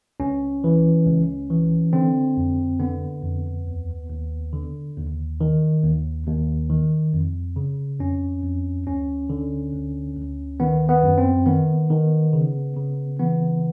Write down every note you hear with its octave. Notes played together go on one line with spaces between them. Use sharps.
C#2 C#4
E3
C#2
E3
D3 C4
F2
D3 B3
F2
D#2
D#2
D3
D#2
D#3
D#2
D#2
D#3
F2
C#3
F2 C#4
F2
D2 C#4
D3
D2
D2
D#3 B3
B3
F#2
C4
D#3 B3
D#3
C#3
C#3
E3 B3